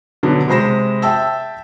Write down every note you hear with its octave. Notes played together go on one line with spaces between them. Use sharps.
B2 D3 F#3
C3 G#3 C5 B5 A#6 E7
E5 G5 A5 E6